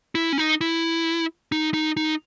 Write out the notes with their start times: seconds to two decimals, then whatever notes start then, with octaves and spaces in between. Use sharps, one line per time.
0.15 E4
0.32 C#4
0.38 D#4
0.61 E4
1.52 D#4
1.74 D#4
1.97 D#4